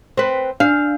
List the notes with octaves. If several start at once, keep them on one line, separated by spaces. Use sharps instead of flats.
C4 B4
D4 F5